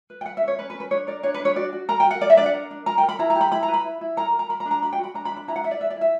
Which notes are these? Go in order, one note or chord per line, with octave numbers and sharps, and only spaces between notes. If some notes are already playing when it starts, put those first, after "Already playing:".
B4
G5
B4 F#5
E5
C#4
C#5
C#4 B4
B4
C#4
B4
D4 C#5
A#4 D5
D4 C#5
B4
D4
C#5
F#4 D5
F#4
A#4 A#5
G5
F#4 F#5
A#4 D5
E5
D4 D5
F#5
A#4
D4
A#4 A#5
G5
A#4
B5
E4 A#5
A#5
G4
B5
E4 B5
A#5
B4
B5
E4
E4
A#4 A#5
A#4
A#5
A#4 B5
A#5
D4
A#5
F#4 B5
G5
F#4
B5
D4 A#5
B5
D4
B5
E4 A#5
F#5
E4 E5
D5
B4 E5
D5
E4 E5